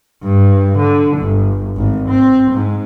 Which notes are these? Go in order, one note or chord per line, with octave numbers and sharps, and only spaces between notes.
G2
D3
G1
G#1
C4
G#2